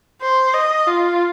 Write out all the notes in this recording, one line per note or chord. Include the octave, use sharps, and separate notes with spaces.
C5
D#5
F4